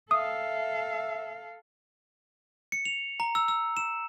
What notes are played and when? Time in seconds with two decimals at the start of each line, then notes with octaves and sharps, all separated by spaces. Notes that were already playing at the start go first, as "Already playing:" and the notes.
0.11 A4 E5 F5 D#6
2.72 C#7
2.85 F7
3.20 A#5
3.35 E6
3.48 E6
3.77 E7